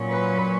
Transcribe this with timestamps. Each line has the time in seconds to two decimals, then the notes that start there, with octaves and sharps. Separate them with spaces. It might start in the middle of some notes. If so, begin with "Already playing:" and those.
Already playing: A#2 F#3 C#4
0.09 B4